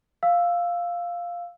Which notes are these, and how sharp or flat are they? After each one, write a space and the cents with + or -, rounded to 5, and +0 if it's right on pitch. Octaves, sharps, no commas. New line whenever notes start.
F5 +0 E6 +0